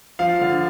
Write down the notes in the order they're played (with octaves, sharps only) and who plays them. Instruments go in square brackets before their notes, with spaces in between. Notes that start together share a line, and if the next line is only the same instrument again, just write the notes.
[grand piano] F3 F5
D3